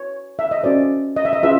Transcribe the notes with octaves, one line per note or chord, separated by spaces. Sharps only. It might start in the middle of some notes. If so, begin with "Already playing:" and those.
Already playing: F#4 B4 C#5
E5
D#5
C#4 F#4 A4 C5 D5
D#5
E5
D#5
C#4 F4 G#4 B4 E5